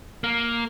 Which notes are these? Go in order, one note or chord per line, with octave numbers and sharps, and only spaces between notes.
A#3